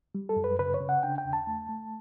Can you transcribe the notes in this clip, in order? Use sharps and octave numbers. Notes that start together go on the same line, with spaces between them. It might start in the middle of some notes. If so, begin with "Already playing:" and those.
G3
A4
F#2
B4
C#3 B4
C#5
C#3
F#5
D4 G5
G5
E2
A5
A3
A3